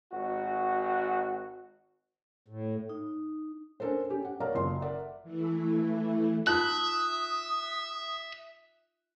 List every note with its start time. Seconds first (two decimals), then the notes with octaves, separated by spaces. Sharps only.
0.12 G#1 F#4
2.48 A2
2.89 D#4
3.80 C#4 D4 A4 A#4 C5
4.10 C#4 G4
4.25 F#5
4.40 A#4 C#5 D5 F5 A#5 F6
4.55 F#1 F#2 F4 C6
4.82 A#4 D5 E5 F#5
5.23 E3 A3 E4
6.47 D#4 F4 E5 D#6 F#6